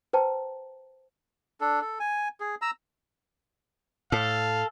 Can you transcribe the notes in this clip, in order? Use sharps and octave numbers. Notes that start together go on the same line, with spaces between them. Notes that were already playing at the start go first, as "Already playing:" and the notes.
B4 C5 G5 A5 A#5
D4 A4
A4
G#5
G#4
A#5 E6
A2 A4 F5